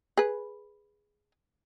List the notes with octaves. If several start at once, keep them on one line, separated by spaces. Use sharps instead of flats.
G#4 B4